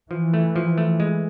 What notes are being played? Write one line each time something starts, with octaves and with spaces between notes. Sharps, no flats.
E3 F3
A3
F3
A3
G#3